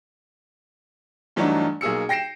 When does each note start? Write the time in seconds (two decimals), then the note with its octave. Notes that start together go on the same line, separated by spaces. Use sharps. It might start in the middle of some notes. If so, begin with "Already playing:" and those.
1.36 G2 E3 F#3 A3 D4 D#4
1.81 B1 A#3 G#4 E6 C#7
2.09 G5 A#6 C7 D7 E7